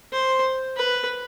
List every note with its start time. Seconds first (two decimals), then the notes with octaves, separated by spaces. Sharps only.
0.12 C5
0.76 B4